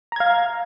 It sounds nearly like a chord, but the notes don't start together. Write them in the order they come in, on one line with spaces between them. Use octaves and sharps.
A#5 G#6 F5